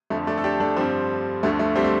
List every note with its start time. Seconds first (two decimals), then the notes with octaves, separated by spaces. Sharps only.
0.10 F2 D3 F3 A3
0.27 A3 D4
0.38 A4
0.44 D4 G4
0.60 A3 D4
0.76 G2 D3 F3 G3 C4
1.43 D2 D3 F3 A3
1.59 A3
1.76 G3 C4
1.84 A3